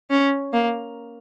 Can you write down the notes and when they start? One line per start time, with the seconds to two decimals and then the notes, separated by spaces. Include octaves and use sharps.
0.10 C#4
0.53 A#3